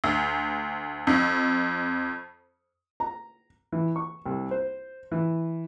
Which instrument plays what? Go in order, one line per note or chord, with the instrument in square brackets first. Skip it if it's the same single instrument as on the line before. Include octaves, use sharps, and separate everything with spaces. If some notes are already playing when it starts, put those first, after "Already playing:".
[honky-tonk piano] D2
F2
[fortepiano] A#5
E3
C#6
C2
C5
E3